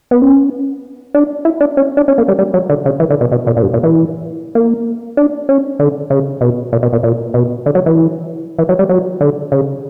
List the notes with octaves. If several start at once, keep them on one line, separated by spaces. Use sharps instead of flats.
B3
C#4
D4
E4
D4
C#4
D4
C#4
A#3
G3
G3
F#3
D3
C#3
E3
D3
B2
B2
A#2
A#2
G2
A#2
E3
A#3
D4
C#4
D3
C#3
B2
A#2
B2
A#2
A#2
B2
D3
F#3
E3
E3
F#3
G3
F#3
D3
C#3